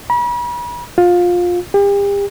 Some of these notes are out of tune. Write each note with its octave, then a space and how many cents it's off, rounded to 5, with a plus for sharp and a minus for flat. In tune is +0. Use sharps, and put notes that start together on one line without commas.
B5 -40
F4 +20
G4 +40